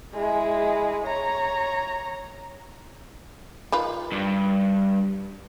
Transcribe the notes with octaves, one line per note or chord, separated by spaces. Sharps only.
G#3 E4
C#5 A#5
D#3 F4 B4
G2